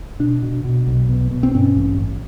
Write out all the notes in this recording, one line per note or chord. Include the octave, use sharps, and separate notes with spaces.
B2 D4
B2
B2
B1
B2
B2
C4
G2 C#4
A1
A1